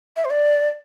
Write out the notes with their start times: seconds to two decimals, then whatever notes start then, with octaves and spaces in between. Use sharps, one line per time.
0.16 E5
0.25 C5
0.30 D5